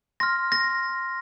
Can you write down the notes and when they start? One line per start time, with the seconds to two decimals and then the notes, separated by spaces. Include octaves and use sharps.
0.20 C6 F6 A#6
0.52 A#6